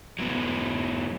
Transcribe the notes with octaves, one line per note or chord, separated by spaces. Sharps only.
F#3 G#3 B3